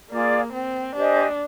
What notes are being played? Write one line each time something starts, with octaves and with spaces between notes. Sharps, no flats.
A#3 F4 G#4 D5
C4
D4 G4 C5 D#5 G#5